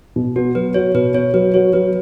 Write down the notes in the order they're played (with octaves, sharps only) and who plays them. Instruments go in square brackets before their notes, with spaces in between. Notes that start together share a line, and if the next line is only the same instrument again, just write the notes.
[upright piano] B2
[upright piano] B3 [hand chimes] F#4
[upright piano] F#3 [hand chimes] B4
[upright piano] F#4 [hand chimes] C#5
[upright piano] B2 [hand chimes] B4
[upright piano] B3 [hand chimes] C#5
[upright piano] F#3 [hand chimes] B4
[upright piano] F#4 [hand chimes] C#5
[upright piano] F#3 [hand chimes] B4